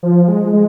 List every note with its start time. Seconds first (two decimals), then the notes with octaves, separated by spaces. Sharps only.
0.03 F3
0.28 G#3
0.53 G#3